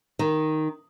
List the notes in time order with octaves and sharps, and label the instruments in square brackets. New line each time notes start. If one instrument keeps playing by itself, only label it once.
[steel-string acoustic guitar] D#3